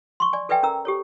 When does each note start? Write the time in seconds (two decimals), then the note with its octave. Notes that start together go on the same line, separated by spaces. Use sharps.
0.20 C6 C#6
0.33 D5 G#5
0.49 A4 B4 D5 E5 G5 G#5
0.63 C#4 A#4 A#5 E6
0.85 G4 A4 C#5